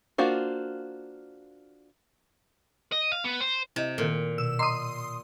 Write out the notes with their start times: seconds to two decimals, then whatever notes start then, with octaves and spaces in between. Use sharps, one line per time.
0.18 A#3 D4 F4 F#4 C5
2.92 D#5
3.12 F5
3.24 B3
3.41 C5
3.76 C3 E4 D#5
3.98 A#2 D#3 A4
4.38 B2 E6
4.59 D#5 A#5 C6 D6 D#6